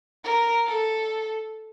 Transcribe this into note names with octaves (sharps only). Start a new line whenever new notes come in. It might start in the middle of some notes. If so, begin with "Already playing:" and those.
A#4
A4